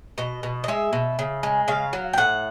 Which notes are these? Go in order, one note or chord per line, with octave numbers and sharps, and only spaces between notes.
B2 D#5
B2
D#5
G#3 E5
B2
C#3
G#3
C#3 F5
F#3
G5
A2 F#5